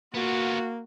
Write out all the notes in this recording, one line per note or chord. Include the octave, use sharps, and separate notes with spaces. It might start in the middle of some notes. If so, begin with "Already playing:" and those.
A#3 B3 F4 F#4